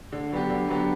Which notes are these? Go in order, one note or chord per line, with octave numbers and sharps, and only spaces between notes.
D3
F#3 B3 D4 G4
D3
F#3 B3 D4 G4